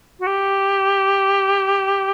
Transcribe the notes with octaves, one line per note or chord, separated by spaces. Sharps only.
F#4
G4